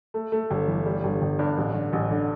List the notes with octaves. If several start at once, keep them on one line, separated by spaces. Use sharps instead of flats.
A3
A3
G1
E3
G3
G1
G1
G2
A1
D3
A1
D3